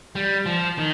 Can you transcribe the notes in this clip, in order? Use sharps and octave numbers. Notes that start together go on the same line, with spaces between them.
G3
F3
D#3